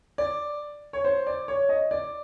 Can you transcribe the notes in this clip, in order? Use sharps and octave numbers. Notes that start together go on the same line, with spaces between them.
D5
C#5
C5
D5
C#5
D#5
D5